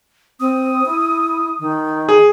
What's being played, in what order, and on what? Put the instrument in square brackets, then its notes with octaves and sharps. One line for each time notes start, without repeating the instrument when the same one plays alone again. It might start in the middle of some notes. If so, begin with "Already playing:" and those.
[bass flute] C4 [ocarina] D#6
[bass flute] E4
D#3
[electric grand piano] G#4